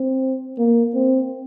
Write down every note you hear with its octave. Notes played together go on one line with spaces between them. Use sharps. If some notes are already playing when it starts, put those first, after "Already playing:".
Already playing: C4
A#3
C4